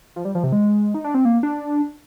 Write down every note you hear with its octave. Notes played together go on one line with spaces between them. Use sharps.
F3
G3
F3
C3
G#3
D#4
D4
C4
A#3
D4